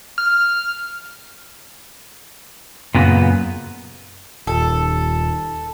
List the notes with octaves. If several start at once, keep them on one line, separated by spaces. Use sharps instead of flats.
F6
F#2 A#2 C#3 B3
D#1 A4